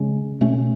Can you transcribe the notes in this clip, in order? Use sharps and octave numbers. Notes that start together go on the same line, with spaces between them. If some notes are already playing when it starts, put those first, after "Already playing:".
Already playing: C#3 G#3 C#4
B2 A3 C#4